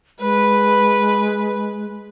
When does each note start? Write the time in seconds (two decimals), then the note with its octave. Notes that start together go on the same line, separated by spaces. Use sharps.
0.20 G#3 B4